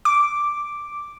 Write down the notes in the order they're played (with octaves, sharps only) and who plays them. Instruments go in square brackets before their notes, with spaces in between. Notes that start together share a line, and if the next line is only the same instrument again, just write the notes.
[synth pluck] D6